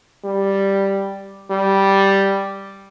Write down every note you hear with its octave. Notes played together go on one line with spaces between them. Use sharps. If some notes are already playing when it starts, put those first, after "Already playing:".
G3
G3